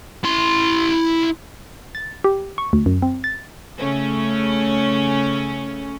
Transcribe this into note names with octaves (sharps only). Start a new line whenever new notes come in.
E4 C6
A6
G4
C#6
D2
F#2
C4
A6
C#3 A3 C#4